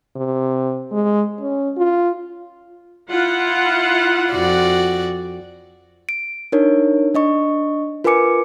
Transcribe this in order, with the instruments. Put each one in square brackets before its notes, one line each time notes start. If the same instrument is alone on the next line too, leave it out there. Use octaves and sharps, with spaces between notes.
[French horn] C3
G#3
C#4
F4
[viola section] E4 F4 F#5
[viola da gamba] F2 F#4 D5
[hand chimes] D7
D4 D#4 A#4 C#5
D4 D#5 C#6
F4 A#4 B4 G#5 D6 C#7